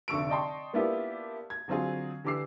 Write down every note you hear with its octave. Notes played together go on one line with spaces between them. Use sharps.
F1 D3 C#6 E6 D7
D5 D#5 G5 A5 C6 C#6
A#3 B3 D4 E4 F4 G4
G#6
D3 F#3 C4 F4 G#4
D3 E3 G4 D6 E6 C7